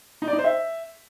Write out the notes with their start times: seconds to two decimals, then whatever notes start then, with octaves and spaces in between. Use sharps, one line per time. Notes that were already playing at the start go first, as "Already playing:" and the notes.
0.22 D#4
0.27 D5
0.33 D#4
0.39 C5
0.44 E5